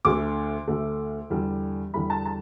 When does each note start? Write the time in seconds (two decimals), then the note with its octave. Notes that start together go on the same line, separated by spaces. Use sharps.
0.05 D2 D3 A3 D6
0.68 D2 D3 A3
1.30 E2 D3 G3
1.94 E2 D3 G3 B5
2.10 A5
2.26 A5